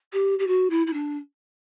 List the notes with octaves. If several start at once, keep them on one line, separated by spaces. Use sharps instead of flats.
G4
G4
F#4
E4
E4
D4